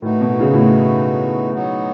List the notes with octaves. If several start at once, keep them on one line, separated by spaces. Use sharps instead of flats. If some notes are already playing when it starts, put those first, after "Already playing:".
A2 E3 A3 D#4 F#4
B2
C#3
A2
B2
F#3 B3 D#4 F#4